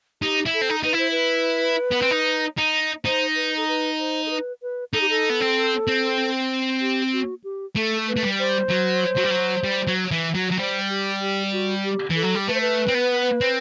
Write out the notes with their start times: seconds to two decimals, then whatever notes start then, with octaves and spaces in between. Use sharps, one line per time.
0.22 D#4 G4
0.46 E4
0.54 A4
0.61 C4
0.70 D#4
0.83 D#4 B4
0.93 E4
0.98 C5
1.11 B4
1.91 B3
2.02 C4
2.11 D#4
2.58 D#4
3.05 D#4 C5
3.36 B4
3.57 A4
3.68 B4
4.00 C5
4.26 A4
4.31 B4
4.62 B4
4.93 D#4 A4
5.01 G4
5.10 A4
5.30 B3
5.41 C4
5.88 C4
6.81 G4
7.13 F#4
7.44 G4
7.76 A3 A4
8.08 B4
8.17 A3
8.23 G3
8.39 C5
8.70 F#3
9.17 F#3
9.24 G3
9.31 F#3
9.64 G3
9.87 F#3
10.11 E3
10.35 F#3
10.51 F#3
10.58 G3 C5
10.89 G4
11.21 G4
11.52 F#4
11.84 G4
12.10 E3
12.16 A4
12.23 F#3
12.34 G3
12.47 A3 B4
12.55 C5
12.61 B4
12.88 C4
12.94 B3
13.41 C4